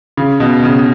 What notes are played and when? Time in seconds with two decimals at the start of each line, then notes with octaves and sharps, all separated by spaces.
0.17 C#3
0.40 B2
0.64 C#3